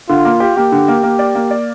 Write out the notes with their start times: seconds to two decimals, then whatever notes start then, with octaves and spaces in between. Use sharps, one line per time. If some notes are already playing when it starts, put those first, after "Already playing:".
0.09 D3 F4
0.25 A#3
0.40 G4
0.57 A#3 G4
0.72 D3
0.88 A#3
1.03 A#3
1.19 D5
1.35 A#3
1.51 D5